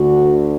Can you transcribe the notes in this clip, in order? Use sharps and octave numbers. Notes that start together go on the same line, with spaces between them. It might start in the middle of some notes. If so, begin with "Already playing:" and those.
Already playing: D2 D3 F#4